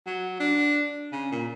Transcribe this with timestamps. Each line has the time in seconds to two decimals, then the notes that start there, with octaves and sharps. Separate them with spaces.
0.06 F#3
0.40 D4
1.12 C#3
1.32 A#2